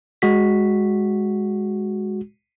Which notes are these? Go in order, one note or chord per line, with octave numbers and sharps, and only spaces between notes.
G#3 F#4 B6